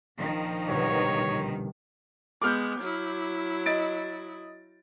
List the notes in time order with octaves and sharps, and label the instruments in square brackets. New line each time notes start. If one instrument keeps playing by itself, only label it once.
[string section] A#1 D#3 F3
[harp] G1 C2 B2 [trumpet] C#5
[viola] G#3 B3 [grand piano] D6 F6 G6
[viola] F#3 E4
[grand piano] D#5 A6 D7